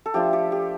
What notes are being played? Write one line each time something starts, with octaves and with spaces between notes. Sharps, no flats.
A4
F3 A3 D4 F4 G4
G4
G4